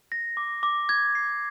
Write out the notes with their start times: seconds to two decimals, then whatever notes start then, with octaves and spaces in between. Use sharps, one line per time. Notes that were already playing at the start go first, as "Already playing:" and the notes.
0.12 A#6
0.37 D6
0.63 D6
0.89 G#6
1.15 C7